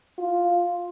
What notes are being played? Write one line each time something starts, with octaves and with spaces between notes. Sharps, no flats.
F4